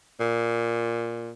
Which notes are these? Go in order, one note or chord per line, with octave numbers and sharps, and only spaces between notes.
A#2